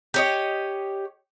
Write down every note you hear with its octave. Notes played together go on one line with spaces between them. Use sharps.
G4 C#5 D#5